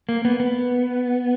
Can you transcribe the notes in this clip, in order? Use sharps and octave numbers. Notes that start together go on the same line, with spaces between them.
A#3
B3
B3